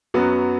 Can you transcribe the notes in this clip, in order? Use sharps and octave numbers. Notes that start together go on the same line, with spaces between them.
F#2 F#3 B3 F#4